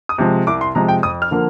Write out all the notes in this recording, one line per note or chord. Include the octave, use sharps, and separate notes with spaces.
D#6
C3 F3 G#3
C2 D6
C6
C3 F3 G#3 A#5
G5
F2 D#6
F6
D3 F3 A#3